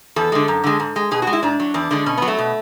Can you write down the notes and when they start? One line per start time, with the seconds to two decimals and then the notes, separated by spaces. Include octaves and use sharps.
0.16 E2 A4
0.32 D3 G#3
0.48 F#2
0.64 D3 G#3
0.80 G#2
0.96 G#3
1.11 B2 G#4
1.22 F#4
1.27 G#3
1.33 E4
1.43 G#2 D4
1.60 F#3
1.74 E2 D4
1.91 D3 G#3
2.06 B2 C#4
2.18 B3
2.22 F#3
2.28 A3
2.38 B2